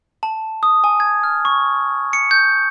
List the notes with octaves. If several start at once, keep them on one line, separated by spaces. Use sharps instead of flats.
A5
D#6
G#5
G#6
F6
C#6
C#7
G6